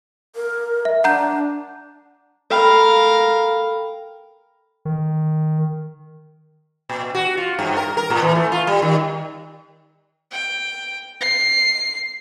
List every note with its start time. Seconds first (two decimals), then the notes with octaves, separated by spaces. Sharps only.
0.36 A#4
0.85 E5
1.04 D4 F#5 A#5 G6
2.51 A4 A#4 F5 G5 B5
4.85 D#3
6.89 A#2
7.15 F#4
7.37 F4
7.59 G2
7.77 A#4
7.97 A#4
8.10 A2
8.22 E3
8.35 A3
8.52 F4
8.67 G3
8.82 D#3
10.31 G5
11.21 C7